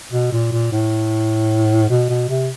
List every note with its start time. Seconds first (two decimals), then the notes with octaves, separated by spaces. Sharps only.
0.12 B2
0.32 A#2
0.51 A#2
0.71 A2
1.90 B2
2.09 B2
2.29 C3